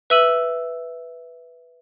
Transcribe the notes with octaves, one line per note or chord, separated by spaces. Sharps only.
B4 E5 E6 D#7 F#7